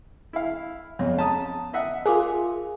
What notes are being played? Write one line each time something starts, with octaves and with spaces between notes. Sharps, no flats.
E4 F5
F2 B3 C#5
C#4 A5 A#5 D#6
D#5 E5 F#5
F4 G#4 A#4 G#5 D6